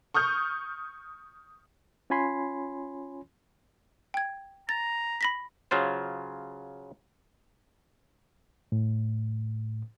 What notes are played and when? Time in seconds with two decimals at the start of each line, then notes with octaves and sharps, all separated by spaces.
0.14 C#6 D#6 F6 G6
2.10 C#4 F4 C#5 G#5 B5 C6
4.14 G5 G#6
4.69 A#5 A6
5.21 B5 A#6 B6
5.71 C#3 F#3 F4 C5
8.72 A2